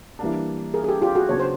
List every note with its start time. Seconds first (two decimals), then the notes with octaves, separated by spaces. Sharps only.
0.19 E3 G3 A#3 D4
0.74 G#4 A#4
0.84 G#4
0.88 G4 A4
1.02 F4 G4
1.15 F#4 G#4
1.29 C#3 F#3 B3 D4 C#5
1.40 C5